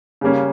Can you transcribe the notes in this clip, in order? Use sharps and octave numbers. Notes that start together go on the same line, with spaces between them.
C#3 G3 A#3 C#4